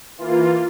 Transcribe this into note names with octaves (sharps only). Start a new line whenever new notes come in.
E3 A#3 F4